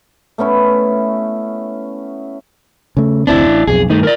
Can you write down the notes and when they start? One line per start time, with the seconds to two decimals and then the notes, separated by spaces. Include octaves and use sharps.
0.38 A3 B3 C#4 E4
2.97 C#3 A3
3.27 F1 D2 C4 D4 E4
3.45 A1
3.67 B1 F2 G#4
3.90 G2 D#3 A3 D#4
4.03 A#4 D5